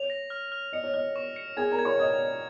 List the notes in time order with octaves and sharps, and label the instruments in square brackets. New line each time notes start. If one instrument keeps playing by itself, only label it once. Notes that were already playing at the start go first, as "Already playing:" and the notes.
Already playing: [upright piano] C#5 [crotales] F7
[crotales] A#6
F6
F6
[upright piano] D#5 [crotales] C#7
[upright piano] C#5
[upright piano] D#5 [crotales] F6
[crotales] C#6
C#7
[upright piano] G#4 G#5 [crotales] G#6
[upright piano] A#4 A#5
[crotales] G#6
[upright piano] C#5 C#6
[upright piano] D#5 D#6 [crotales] G#6